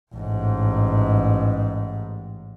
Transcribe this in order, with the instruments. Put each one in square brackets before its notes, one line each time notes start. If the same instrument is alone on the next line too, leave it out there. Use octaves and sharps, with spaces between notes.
[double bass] A1 G#2